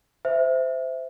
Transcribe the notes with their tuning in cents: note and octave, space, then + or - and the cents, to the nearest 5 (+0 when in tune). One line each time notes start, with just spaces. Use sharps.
C5 -20 E5 +0